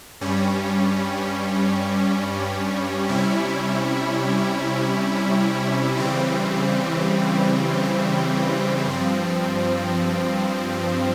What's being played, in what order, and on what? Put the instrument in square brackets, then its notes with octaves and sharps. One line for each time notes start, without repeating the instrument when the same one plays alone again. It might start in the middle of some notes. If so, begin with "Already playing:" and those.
[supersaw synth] G2 G3 C#4
C3 G3 C#4 E4
C#3 E3 G3 C4
G2 F3 C4